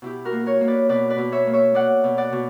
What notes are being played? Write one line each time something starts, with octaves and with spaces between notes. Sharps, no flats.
B2 E4 G4
F#4 A#4
A#3
A#4 C#5
A#3
B4 D5
B2 B4 D5
B4 D5
B2
C#5 E5
A#3
C#5 E5
A#3 D5 F#5
B2
D5 F#5
B2